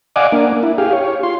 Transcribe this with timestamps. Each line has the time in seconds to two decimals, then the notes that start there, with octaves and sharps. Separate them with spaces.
0.16 D5 D#5 F5 F#5 G#5 D6
0.32 A#3 D4
0.63 E4
0.78 G4 G#4 F5
0.93 C#5
1.23 F4 C6